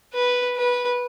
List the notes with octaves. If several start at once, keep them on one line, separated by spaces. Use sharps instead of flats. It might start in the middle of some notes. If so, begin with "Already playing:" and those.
B4
B4